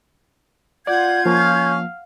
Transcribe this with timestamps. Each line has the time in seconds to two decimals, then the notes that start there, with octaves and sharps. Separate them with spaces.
0.87 F4 D5 F#5 G6 G#6
1.26 F3 A#3 C#4 F5